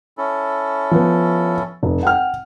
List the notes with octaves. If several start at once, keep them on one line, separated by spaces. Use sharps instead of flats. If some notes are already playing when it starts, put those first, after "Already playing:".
C#4 E4 A4
F3 B3
F1
F#5 G5 F6